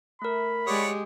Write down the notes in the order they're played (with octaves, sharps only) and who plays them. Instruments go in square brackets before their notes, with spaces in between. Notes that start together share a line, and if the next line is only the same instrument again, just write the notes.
[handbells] A3 A#4 [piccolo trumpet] B5
[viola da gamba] G#3 G4 [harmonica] C#5 D5 F#5 [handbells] D#6